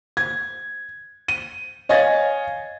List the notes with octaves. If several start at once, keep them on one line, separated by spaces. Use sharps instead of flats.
G#6
D#7
C#5 D#5 F5 G#5 G#6 A6